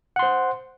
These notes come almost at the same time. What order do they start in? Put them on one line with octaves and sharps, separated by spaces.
F#5 C6 C5